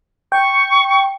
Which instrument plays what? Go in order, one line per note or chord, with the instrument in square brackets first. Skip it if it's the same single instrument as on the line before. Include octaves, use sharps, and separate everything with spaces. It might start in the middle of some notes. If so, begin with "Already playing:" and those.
[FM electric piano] G5 [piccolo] C#6